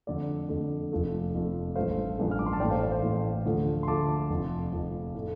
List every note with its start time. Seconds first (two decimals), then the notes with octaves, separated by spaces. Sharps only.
0.07 F2 D3 A3 D5
0.49 F2 D3 A3
0.92 F1 F2 F3 A3
1.34 F1 F2 F3 A3
1.75 A1 G2 F3 A3 C5 F5
2.18 A1 G2 F3 A3
2.31 F6
2.39 D6
2.46 C6
2.53 A5
2.60 A1 A2 A3 D5 G5
2.71 C5 F5
2.82 D5
2.92 C5
3.02 A1 A2 A3
3.45 D2 D3 F3 A3
3.83 C6
3.87 D2 D3 F3 A3 A5 D6
4.30 F1 F2 F3
4.72 F1 F2 F3
5.15 A2 A3